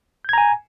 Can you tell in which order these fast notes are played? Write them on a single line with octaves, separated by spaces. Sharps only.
G6 G#6 A#5 G#5